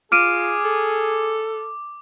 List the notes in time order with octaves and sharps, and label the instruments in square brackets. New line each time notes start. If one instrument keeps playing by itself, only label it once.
[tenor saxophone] F4 [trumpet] G#4 [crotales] D6 [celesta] F6 D7 D#7
[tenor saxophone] A4